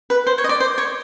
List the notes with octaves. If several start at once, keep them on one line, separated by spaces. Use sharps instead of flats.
B4
C5
C#5
D#5
D5
C5
C#5